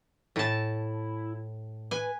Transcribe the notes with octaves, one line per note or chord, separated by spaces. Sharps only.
A2 E4 A5
B4 G#5